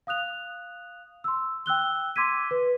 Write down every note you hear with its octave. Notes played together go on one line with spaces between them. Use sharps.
F5 D#6 F#6 F7
C6 E6
G5 E6 F#6 G7
C6 D6 E6 G#6 B6 D#7
B4